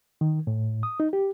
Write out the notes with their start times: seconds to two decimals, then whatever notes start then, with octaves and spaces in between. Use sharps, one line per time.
0.21 D#3
0.47 A2
0.83 D#6
1.00 D#4
1.13 G4